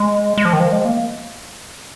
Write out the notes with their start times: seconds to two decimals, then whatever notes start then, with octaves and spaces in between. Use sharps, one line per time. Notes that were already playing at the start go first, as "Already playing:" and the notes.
Already playing: G#3
0.38 G#3
0.45 F3
0.53 D#3
0.60 F3
0.72 G#3
0.85 A#3